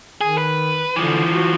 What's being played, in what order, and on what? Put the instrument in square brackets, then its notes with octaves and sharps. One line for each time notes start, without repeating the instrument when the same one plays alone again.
[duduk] D#3 [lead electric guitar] G#4
[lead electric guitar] B4
[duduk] D3 [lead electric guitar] E3 F3
[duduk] F#4